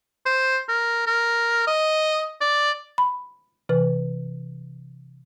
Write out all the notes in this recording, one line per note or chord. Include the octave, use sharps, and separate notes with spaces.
C5
A#4
A#4
D#5
D5
B5
C3 E3 B4